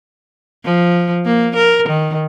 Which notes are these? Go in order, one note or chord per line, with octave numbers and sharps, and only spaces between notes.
F3
A#3
A#4
D#3